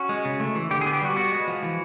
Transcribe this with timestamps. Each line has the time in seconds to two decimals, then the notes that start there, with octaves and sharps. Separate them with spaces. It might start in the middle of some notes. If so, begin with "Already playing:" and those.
Already playing: C#4 F#4
0.09 G#3
0.25 C#3
0.40 A3
0.55 E3
0.71 D3 G4
0.81 B3 G#4
0.93 G4
1.02 G3 F#4
1.16 B3 F#4
1.31 G#3
1.48 F3
1.63 E3